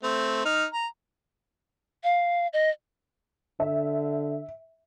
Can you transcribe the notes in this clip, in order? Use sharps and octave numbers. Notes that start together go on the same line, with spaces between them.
A3 C4
D#4 F6
A#5
F5
D#5
D3 E5